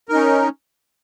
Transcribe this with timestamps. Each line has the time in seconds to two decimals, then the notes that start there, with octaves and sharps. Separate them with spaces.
0.09 A#4
0.12 D#4
0.15 C#4